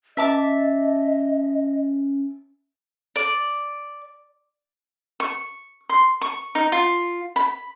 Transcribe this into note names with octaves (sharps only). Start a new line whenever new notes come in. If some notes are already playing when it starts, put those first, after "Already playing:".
C#4 D#5 E5 A5 D6
D5
C#6
C6
C#6
D#4
F4
B5